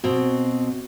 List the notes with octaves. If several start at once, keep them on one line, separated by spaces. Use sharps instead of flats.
B2 C4 F#4